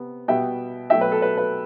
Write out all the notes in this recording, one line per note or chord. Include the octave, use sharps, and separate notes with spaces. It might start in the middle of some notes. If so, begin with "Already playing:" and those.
Already playing: C3 B3
B2 G3 B3 E5 G5
B2 F#3 A3 E5 G5
B4
A4
B4
B4